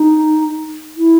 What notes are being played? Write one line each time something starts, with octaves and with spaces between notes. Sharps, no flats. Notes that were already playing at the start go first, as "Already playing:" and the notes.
Already playing: D#4
E4